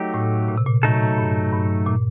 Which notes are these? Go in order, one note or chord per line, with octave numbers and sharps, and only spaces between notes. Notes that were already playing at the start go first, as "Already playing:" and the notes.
Already playing: F#3 A3 D#4 G4
A2
A#2
C3
A#2
F#3 A3 D#4 A4
G2
G2
A#2